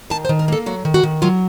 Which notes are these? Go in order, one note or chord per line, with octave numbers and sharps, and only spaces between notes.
D#3 A5
C5
D#3
A#4
A#3 A4
F#3 F#4
D#3
F#4
D#3
F#3 F4